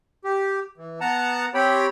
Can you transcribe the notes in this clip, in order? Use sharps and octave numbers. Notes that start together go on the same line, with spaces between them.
G4
E3
B3 F#5 A5 A#5
C4 G4 C#5 G5 B5